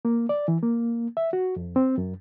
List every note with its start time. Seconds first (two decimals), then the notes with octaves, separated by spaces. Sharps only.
0.05 A#3
0.29 D5
0.48 E3
0.62 A#3
1.17 E5
1.33 F#4
1.56 F2
1.76 C4
1.98 F#2